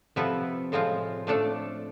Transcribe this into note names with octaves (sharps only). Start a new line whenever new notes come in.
C3 F3 B3 E4 A4
A2 F3 G#3 C4 F4
F3 A3 D4 A4